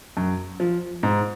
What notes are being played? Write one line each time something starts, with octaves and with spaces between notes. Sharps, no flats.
F#2
F3
G#2